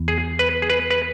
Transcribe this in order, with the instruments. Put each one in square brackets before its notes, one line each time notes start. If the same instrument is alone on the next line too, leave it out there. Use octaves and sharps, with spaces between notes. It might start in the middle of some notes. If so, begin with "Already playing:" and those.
Already playing: [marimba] E2 E3 B3
[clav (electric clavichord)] G#4
B4
G#4
B4
B4